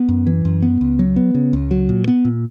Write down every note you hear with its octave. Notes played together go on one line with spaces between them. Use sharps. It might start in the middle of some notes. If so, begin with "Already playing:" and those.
Already playing: B3
F#2
E3
F#2
B3
C#2
F#3
B3
C#3
C#2
F#3
A#2
B3
A#2